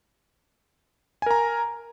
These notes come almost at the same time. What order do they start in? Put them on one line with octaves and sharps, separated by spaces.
G#5 A#4 A#5